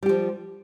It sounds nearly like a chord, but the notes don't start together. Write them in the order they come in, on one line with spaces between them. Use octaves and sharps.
G3 G4 F3